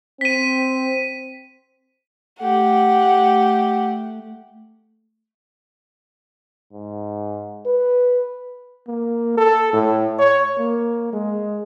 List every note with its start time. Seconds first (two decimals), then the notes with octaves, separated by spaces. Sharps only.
0.21 C4 B6 D#7
2.40 A3 G4 F#5
6.73 G#2
7.66 B4
8.87 A#3
9.37 A4
9.73 A2
10.19 C#5
10.58 A#3
11.13 G#3